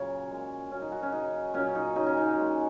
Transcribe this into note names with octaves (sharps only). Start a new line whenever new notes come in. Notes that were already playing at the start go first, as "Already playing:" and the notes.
Already playing: A#2 C#3 F#3 A#4 C#5
A#2 G#3
A#2 F#3 C#4
D#4
F#4
C#4
C#3 F#3 D#4
A#2 F#3 C#4
D#4
C#3 F#3 D#4
C#4
D#4
F#4
A#2 G#3